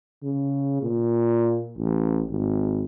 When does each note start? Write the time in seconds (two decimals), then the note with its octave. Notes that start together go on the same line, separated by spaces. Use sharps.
0.23 C#3
0.82 A#2
1.77 A1
2.31 G#1